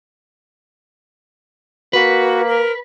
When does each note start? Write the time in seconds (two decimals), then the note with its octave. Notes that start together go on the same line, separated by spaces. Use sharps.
1.93 A#3 F#4 B4
2.48 A#4